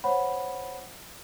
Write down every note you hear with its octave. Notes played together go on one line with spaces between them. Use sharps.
C5 C#5 F#5 B5